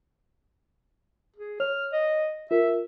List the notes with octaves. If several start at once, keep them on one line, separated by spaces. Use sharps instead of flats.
G#4
C#5 F6
D#5
F4 A#4 E5